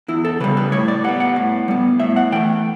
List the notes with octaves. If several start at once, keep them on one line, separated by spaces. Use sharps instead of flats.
E2 E4
A4
C#3 G3 B4
B4
A2 C#5
D5
G3 B3 F#5
F#5
A2
G3 B3
A2 E5
F#5
E3 A3 G5